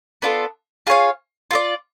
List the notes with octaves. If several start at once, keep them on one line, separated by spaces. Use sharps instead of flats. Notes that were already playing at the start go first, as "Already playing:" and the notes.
B3 D4 F4 A4
F4 G#4 C#5 F5
F4 A4 D5